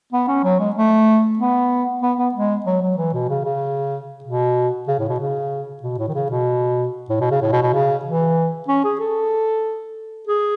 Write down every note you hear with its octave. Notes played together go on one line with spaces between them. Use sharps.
B3
C#4
F#3
G#3
A3
B3
B3
B3
G#3
F#3
F#3
E3
B2
C#3
C#3
B2
C#3
A2
B2
C#3
B2
A2
D#3
C#3
B2
A2
B2
C#3
A2
B2
B2
C#3
E3
C#4
G#4
A4
G#4